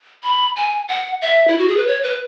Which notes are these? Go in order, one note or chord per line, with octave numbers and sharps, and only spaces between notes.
B5
G#5
F#5
E5
E4
F#4
G#4
B4
C#5
B4